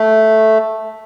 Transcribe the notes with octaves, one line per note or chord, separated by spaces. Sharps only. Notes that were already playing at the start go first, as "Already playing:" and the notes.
Already playing: A3